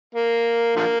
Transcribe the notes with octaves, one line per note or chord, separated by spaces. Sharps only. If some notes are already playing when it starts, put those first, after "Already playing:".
A#3
D3 F3 A#3